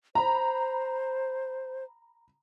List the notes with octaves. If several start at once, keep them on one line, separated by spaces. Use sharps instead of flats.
C5 A#5 B5